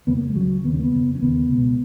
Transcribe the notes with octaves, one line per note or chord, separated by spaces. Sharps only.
F2 C#3 B3
A#3
G#3
C#2 C#3 F#3
D#2 C#3 B3
C#4
A#3
B3
F2 C#3
C#4
D#2 C#3 B3
C#2 B2